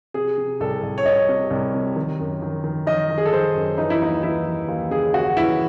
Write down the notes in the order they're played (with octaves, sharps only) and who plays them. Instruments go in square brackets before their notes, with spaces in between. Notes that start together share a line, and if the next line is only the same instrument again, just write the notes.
[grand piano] C3 G#4
C3
C2 A4
C2
C#5
C2 D#5
C3
C2
C3
D#3
F#2
D#3
D#3
D#3 D#5
D#3
G#4
A4
D#3 C5
F#2
E3 D#4
E4
D#2 D#4
E3 E4
E3
D#2
C#3 G#4
C#3 F#4
E3 E4